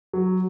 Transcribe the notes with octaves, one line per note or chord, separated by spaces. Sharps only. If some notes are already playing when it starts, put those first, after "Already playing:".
F#3